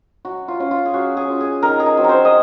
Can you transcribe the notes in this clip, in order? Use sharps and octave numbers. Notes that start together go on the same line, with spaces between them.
F#3 F#4
F4
C#4 F4
F4
G#4
F#3 F#4
G#4
C#4 F4
G#4
D#3 A#4
G#4
A#4
F#3 C4
A#4 C5
D#5